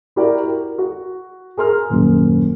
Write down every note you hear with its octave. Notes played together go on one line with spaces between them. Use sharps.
E4 F#4 G4 A#4 D5
A#4
F#4
G#4 A#4 C6 F6
D#1 F#2